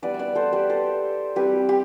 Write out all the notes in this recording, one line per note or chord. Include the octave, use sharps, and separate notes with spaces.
G3 B3 E4 B4 D5
E5
B4 D5
A4 C5
G4 B4
A4 C5
G3 C4 E4 G4 B4
G4